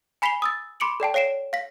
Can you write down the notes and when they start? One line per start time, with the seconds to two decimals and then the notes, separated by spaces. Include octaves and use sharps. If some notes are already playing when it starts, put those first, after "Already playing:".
0.22 G#5 B5 B6 C7 F7 G7
0.42 D#6 E6 A6
0.80 B5 C6 D6 C#7 D7 F#7
1.00 A4 D5 G5 A5
1.14 C#5 F5 C7 D7 E7
1.53 F5 B6